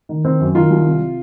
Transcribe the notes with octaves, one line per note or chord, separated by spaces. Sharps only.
D#3
D#3 C4
F#2
D#3 F4
C2
C3